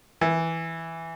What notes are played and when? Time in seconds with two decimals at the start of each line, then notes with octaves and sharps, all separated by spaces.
0.21 E3